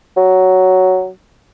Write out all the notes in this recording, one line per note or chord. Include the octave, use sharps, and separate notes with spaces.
F#3